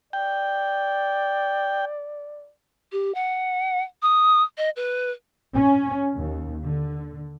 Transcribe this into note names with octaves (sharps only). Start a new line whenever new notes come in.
D5 G5
G4
F#5
D#6
D#5
B4
C#4
D#2
D3